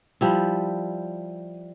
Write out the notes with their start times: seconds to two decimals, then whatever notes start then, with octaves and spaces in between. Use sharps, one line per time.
0.21 F3 G3 E4